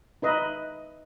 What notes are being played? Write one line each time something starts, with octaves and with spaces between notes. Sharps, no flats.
D#4 B4 D#5 E5